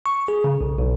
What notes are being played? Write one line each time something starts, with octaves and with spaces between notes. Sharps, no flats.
C#6
G#4
C#3
B1
B1